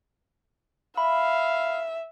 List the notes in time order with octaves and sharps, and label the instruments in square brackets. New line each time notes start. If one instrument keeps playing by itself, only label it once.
[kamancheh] E5 [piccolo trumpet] F5 [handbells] B5